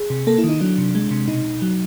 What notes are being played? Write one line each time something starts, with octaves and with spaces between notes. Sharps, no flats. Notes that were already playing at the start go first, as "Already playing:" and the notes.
Already playing: G#4
C3
A#3 A4
E4
D#3 D#4
F#3 D4
C3
G#3
C3
B2 D#4
B2
F#3